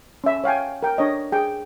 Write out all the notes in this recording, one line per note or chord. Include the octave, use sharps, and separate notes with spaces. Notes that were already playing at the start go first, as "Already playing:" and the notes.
C#4 E5
C#5 F5 G5 G#5
A#4 G5
D4 C#5 D#5
G#4 G5